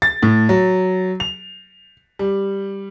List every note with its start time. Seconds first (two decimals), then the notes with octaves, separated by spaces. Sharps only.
0.02 A6
0.23 A2
0.49 F#3
1.20 F7
2.19 G3